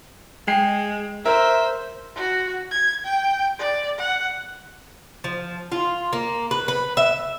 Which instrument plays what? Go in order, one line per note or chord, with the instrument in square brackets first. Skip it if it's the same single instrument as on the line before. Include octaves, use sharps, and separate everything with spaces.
[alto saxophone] G#3 [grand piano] G5 C7
[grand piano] A#4 [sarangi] C5 [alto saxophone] E5
[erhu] F#4
G#6
G5
D5
F#5
[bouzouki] F3
F4
A#3
B4
B4
E5